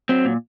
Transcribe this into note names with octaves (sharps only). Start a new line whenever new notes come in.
F#3 C4
A#2